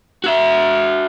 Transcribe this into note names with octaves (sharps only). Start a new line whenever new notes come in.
F#4 E5